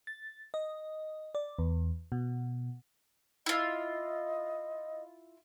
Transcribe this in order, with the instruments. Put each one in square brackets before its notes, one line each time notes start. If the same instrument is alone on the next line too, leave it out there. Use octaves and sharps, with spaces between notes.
[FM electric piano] A6
D#5
D5
E2
B2
[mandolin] E4 F4 [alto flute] D#5